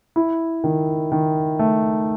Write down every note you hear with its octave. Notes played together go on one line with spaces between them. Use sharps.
E4
D#3
D#3
A3